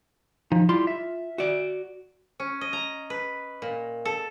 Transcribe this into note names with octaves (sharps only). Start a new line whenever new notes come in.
F3 D#4
G3 E4 F4 C6
E5
F#4 D5
C#4
D#5
A#5
B4
A#2
A4